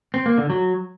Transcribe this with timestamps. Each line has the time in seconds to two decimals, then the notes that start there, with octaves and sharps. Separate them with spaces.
0.14 C4
0.26 A#3
0.38 D3
0.50 F#3